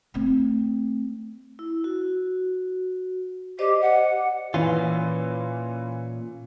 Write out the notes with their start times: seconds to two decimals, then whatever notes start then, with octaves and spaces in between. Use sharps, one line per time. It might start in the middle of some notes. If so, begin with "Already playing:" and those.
0.14 A3 C4
1.59 E4
1.84 F#4
3.59 G4 C5 D5 D#5
3.81 F#5
4.54 A#2 E3 C#4 F4